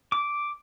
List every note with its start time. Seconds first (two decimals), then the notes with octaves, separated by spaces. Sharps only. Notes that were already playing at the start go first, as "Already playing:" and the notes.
0.12 D6